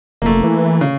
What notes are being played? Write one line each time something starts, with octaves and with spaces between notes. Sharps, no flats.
F1 A3 A#3
E3
C#3